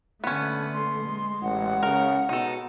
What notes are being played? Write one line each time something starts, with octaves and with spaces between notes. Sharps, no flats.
D3 A3 B3 C#4
C6
G#3
A1 F#5
C#3 A#4
B2 D#4 A4